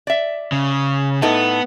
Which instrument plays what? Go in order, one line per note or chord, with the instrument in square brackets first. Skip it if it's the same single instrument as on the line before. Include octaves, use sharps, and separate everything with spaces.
[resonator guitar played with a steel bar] D5 E5
[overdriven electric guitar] C#3
[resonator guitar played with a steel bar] A2 D#4 A4 [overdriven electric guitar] B3